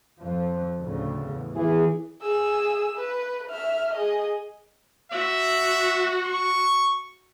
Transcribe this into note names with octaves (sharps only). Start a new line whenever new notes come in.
F2 F3
D2 A2 C#3
E2
E3 G#4
G#4 E6
B4
E5 F6
G#4 D#5
F#4 E5
C#6